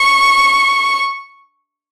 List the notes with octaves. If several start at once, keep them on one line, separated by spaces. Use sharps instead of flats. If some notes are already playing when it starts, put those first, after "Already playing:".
Already playing: C#6